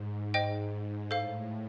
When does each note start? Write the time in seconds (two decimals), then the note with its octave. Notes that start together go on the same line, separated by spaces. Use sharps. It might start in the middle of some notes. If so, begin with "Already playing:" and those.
Already playing: G#2
0.34 G#2 C5 D#5 G5
1.11 A2 A4 C5 F5